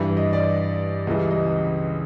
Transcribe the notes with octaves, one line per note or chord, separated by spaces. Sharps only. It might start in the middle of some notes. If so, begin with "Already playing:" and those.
Already playing: G2 E3 G3
D#5
D5
C#2 C#3 E3 G3 D#5
D#5